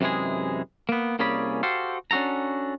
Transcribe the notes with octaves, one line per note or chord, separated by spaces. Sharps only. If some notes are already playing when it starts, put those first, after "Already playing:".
F#2 C3 E3 G#3 G#4
A#3 B3
C2 A#3 C#4 G#4 D5 B5
F#4 G4 A4 C5 F5
C#4 D4 F#4 A4 A#5